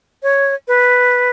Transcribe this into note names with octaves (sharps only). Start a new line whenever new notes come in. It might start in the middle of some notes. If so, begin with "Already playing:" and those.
C#5
B4